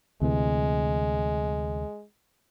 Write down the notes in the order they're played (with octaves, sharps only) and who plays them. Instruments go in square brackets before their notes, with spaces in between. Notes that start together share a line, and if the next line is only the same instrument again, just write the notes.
[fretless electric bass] D2 C3 E3 [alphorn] G#3